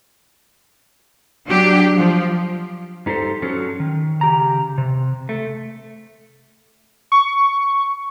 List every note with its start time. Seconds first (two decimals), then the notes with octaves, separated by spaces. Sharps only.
1.46 F#3 D4 G4
1.96 F3
3.06 G2 D#4 G4 A4 C5
3.42 F#3 C#4 A4
3.80 D#3
4.21 C#3 G4 A#5
4.78 C3
5.29 A3
7.12 C#6